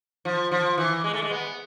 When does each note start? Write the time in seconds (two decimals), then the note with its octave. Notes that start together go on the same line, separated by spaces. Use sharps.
0.25 F3
0.51 F3
0.78 E3
1.04 G#3
1.13 A3
1.22 G#3
1.31 B3